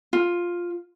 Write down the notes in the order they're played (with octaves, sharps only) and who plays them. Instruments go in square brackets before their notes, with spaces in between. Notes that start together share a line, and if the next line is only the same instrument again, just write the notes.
[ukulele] F4